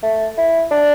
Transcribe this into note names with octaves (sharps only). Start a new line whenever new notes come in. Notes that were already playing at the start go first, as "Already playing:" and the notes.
A3
E4
D4